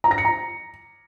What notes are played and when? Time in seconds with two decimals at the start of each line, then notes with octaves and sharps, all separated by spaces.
0.04 A#5
0.11 A#6
0.18 C#7
0.25 A#5